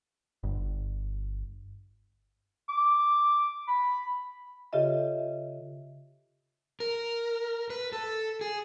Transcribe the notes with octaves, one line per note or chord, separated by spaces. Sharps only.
G1
D6
B5
C#3 F4 G4 A4 D#5 E5
A#4
B4
A4
G#4